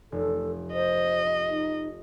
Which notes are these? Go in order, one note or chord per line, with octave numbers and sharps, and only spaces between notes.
F1 A4
C5 D#5
D#4